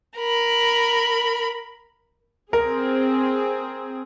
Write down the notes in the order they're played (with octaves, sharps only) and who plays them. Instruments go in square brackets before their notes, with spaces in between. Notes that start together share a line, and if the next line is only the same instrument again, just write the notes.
[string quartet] A#4 B5
[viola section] C4 G#4 [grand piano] A#4